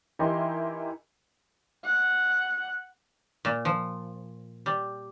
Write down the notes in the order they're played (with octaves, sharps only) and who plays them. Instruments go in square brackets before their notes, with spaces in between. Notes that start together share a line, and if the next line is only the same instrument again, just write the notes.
[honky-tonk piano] E3 D#4 E4 G4 A#4 C6
[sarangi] F#5
[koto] A#2
F3
G3